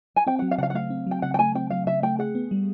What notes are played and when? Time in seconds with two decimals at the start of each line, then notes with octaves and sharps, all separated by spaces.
0.16 G#5
0.27 C4 G5
0.39 F#3 F#5
0.51 F5
0.58 C#3 F#5
0.63 F5
0.70 F#5
0.74 A3 F5
0.90 C4
1.07 F#3 G5
1.22 C#3 F#5
1.34 G5
1.39 A3 G#5
1.55 C4 G5
1.70 F#3 F5
1.86 C#3 E5
2.02 A3 G5
2.19 G#4 F#5
2.35 B3
2.51 G3